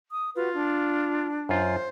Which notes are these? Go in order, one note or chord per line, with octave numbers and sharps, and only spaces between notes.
D#6
F4 F#4 B4
D4
F#2 F4 C5